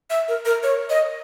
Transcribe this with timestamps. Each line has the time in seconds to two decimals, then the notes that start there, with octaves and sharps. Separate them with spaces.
0.10 E5
0.28 A#4
0.45 A#4
0.63 C#5
0.90 D#5